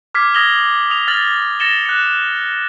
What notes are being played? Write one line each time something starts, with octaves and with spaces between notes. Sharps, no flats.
D6 F6 G#6 B6 C7
D#6 G#6 A#6 F7 G7
D#6 F7
F6 A6 F#7
A6 A#6 C#7 E7 G7
F#6 C#7